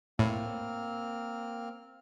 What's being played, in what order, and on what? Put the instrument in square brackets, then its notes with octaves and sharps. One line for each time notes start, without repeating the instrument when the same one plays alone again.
[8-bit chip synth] A2 [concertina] A#3 C4 F6